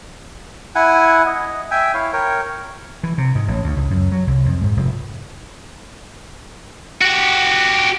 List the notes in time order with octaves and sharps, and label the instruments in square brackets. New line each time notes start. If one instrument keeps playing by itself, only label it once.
[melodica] E4 F#5 G#5
D#5
E5 G5 G#5
E4 C#5 F5
A#4 C#5 G5
[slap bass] E3
C3
G#2
A1
D2
C#2
F#2
F#3
C2
F2
G#2
F1
[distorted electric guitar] F#4 G4